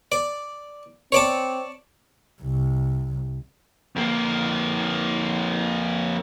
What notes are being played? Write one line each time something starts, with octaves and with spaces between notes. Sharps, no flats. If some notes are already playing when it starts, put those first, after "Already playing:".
D5
C4 C#5 D5 A5
C2
F2 A#3